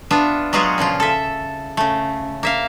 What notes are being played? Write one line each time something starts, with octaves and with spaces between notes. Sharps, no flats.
B3 D4 F4 E5
F#3 G#3 B3 F4 F#4 G#4
A#2 C#3 F3 F4
A4 E5
C#3 A3
A#3 E5 F5